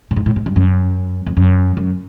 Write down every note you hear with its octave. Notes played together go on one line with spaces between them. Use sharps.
A2
G#2
A2
G#2
G2
F#2
F2
F#2
F#2